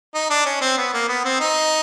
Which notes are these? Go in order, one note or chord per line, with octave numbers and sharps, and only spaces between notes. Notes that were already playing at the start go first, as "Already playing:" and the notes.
D#4
D4
C#4
C4
B3
A#3
B3
C4
D#4